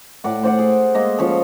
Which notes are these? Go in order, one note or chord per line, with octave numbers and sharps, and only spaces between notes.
A2 D5 F#5
C5 D5 F#5
G#4
G#3 A#3 D#5
F3 C#4 A4